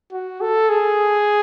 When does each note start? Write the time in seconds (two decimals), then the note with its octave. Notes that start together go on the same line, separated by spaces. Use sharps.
0.12 F#4
0.41 A4
0.69 G#4